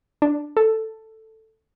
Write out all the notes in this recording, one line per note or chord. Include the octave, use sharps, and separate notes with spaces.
D4
A4